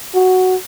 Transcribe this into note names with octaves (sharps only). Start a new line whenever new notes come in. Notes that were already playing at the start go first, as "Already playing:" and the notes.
F#4